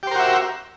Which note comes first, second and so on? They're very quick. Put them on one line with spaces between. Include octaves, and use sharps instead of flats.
G4 C5 A#4 F#4 E5